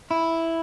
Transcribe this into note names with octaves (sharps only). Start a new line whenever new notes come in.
E4